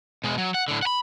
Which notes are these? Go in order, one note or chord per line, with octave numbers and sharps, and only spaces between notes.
B2 G#3
F#3
F#5
A2 D3
F#5 B5